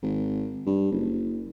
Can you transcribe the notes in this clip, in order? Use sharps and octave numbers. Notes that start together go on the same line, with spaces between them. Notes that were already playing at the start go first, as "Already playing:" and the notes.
G#1
G2
F#1